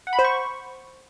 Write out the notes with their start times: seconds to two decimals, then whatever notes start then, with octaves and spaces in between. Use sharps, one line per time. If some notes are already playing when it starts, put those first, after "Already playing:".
0.07 F#5
0.13 B5
0.19 C5
0.25 C#6